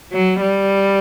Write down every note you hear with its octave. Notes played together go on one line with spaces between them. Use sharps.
F#3
G3